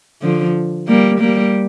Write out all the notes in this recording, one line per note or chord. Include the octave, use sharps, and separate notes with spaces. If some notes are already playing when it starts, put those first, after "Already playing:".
D3 F3
G3 A#3
G3 A#3